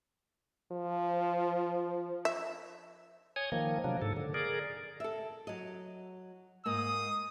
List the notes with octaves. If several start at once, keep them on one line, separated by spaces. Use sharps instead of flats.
F3
E5
C#5 G#5 D#6
D#3 F3 A#3
C3 F3 F#3 A#3 D4
G#2 A4
D3
G#4 A#4 D5
A4 E5
F#3 D#5
G#2 A#3 D#6